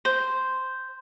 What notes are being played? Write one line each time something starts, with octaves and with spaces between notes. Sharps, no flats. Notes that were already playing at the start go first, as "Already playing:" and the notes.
C5